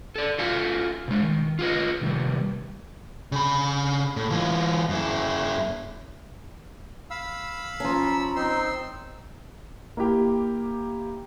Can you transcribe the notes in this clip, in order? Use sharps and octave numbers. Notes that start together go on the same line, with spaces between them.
A4 D5
F4 F#4 A4 E5 F5 G#5
B2 G#3
D#3
F4 G#4 B4 D#5
C3 D#3 G3
C#3 B5
A2
E3 F4
F#2 E4
F5 B5 E6
F3 C#4 A#5
C4 D#4 C6 E6
A#3 E4 G4